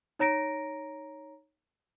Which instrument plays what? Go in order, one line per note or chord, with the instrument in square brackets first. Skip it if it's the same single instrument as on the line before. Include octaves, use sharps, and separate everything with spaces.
[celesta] D#4 C#5 A#5 A#6 D7